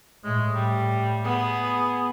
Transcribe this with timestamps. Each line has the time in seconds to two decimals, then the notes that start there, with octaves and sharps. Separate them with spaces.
0.24 A2 G#3
0.54 G3
1.24 B3 G#4